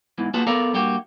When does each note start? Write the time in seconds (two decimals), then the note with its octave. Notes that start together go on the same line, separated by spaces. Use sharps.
0.18 E2 G#2 E3
0.34 A#3 F4 F#4 G#4 B4 A5
0.47 B3 A4 A#4 D5 F5 A#5
0.74 G2 A#3 F#4 G4